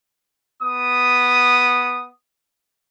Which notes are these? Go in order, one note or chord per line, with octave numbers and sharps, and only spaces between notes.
B3 D#6